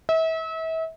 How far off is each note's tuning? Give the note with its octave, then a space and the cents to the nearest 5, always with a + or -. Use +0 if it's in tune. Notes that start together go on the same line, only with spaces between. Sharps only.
E5 -35